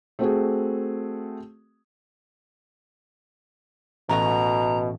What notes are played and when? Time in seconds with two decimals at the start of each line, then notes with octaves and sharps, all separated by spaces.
0.19 A3 C4 F#4 G#4
4.09 A1 B2 A3 F#4 A#5